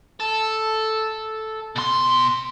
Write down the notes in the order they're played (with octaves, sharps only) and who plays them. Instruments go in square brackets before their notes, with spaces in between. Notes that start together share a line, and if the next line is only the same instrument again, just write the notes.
[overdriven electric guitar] A4
B2 C6